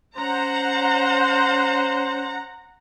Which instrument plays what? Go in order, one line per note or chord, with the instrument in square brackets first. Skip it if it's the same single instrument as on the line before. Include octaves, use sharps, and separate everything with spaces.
[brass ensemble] C#4 C5 [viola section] F#5 A#5